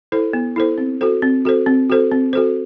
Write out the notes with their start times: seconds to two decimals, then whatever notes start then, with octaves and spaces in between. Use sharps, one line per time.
0.12 E4 A4 C5
0.33 B3
0.56 E4 A4 C5
0.78 C4
1.01 F#4 A4 C5
1.22 C4
1.45 F#4 A4 C5
1.66 C4
1.90 F#4 A4 C5
2.12 C4
2.33 F#4 A4 C5